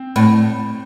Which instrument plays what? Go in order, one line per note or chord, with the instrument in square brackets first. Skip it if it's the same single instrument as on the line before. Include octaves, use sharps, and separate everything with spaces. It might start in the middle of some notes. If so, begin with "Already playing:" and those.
Already playing: [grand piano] C4
[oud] A2